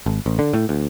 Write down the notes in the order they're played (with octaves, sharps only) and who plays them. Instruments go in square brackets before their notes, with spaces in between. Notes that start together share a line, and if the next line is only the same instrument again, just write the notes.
[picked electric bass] G#1
A1
D3
A2
D2